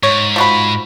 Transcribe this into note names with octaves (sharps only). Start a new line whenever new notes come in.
G#2 C#5
F3 F#4 B5